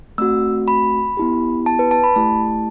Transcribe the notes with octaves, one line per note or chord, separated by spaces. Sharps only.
A3 C4 F#4 E6
B5
B3 E4 G4
A5
B4
A5
B5
A3 E4 G4 A5